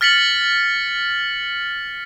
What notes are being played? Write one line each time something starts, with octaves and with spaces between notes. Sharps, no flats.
F6 A6 B6 C#7 F#7